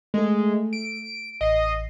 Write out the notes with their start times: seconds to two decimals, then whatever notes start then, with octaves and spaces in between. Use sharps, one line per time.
0.14 G#3 A3 A4
0.73 D7
1.41 A1 D#5 C7